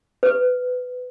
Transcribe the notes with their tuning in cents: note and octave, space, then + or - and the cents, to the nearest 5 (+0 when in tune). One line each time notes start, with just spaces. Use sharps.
B4 +20